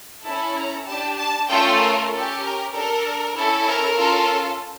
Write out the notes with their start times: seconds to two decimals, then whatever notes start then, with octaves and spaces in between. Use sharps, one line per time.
0.24 C#4 E4 A4 A5
0.55 A#5
0.86 D4 G4 A5
1.17 A5
1.49 A3 C#4 F4 A4 G5
1.79 A#4
2.11 C#4 G4 A4
2.42 A#4
2.72 D4 A4 A#4
3.35 C#4 E4 A4
3.66 A#4
3.97 C#4 F4 A4